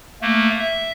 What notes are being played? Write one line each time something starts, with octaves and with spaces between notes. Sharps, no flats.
A3 A#3
E5